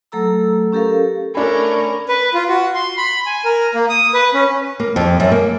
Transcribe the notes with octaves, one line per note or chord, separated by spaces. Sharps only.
F#3 A3 A4 A#5 E6
C#4 G4 A4 A#4 F5
A3 C#4 D4 A#4 G#5 B5
B4
F4
F#4
C6
B5
G#5
A#4
A#3
D#6
B4
C#4
A#3
F2
F#2
A#3